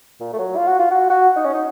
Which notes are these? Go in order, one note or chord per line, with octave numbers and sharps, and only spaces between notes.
A#2
A3
F#3
F4
F#4
F4
F#4
F#4
D#4
C#4
D#4